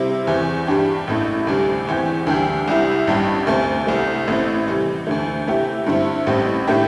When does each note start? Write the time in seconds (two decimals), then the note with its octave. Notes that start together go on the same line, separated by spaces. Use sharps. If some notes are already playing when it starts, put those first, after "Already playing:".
Already playing: C3 G3 C4 E4
0.27 E2 E3 C4
0.67 G2 G3 D4 G4
1.07 A1 A2 A3
1.47 D2 C3 G3 D4
1.87 E2 E3 C4 G4
2.27 D2 D3 G3 D4 G4
2.68 C2 C3 G3 E4
3.07 A1 G2 G3 D4 G4
3.47 D2 C3 A3 C4
3.87 C2 C3 A3
4.28 A1 A2 A3 C4
4.67 C3 E3 G3
5.07 D2 D3 A3
5.47 C3 A3 E4 G4
5.86 G2 D3 C4 E4
6.27 A1 A2 G3 C4 G4
6.67 A2 A3 D4 G4